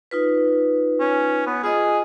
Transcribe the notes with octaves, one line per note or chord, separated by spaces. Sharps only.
D#4 F4 B4
C#4
B3
F4 G#4 D#5